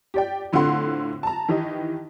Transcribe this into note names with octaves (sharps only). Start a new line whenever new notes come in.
G4 D5 G5
A2 D3 C4 F4 F#5 C6
A5 A#5
D#3 E3 G4 D#5